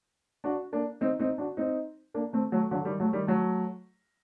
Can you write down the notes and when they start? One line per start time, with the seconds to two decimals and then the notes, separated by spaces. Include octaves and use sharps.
0.44 D4 F#4
0.72 A#3 D4
1.01 C4 D#4
1.19 C4 D#4
1.38 D4 F#4
1.57 C4 D#4
2.14 A#3 D4
2.33 A3 C4
2.52 F#3 A3
2.71 D3 F#3
2.85 D#3 G3
3.00 F#3 A3
3.13 D#3 G3
3.27 F#3 A3